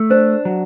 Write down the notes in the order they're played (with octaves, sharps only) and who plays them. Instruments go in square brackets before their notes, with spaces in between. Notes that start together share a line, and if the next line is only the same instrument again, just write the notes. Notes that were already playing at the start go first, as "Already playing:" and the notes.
Already playing: [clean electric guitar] A3
[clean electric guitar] D4 [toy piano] C5
[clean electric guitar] F#3